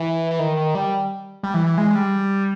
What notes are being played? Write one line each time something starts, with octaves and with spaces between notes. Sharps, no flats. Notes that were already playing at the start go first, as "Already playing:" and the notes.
Already playing: E3
E3
D#3
D#3
G3
G3
E3
E3
G#3
G#3
G3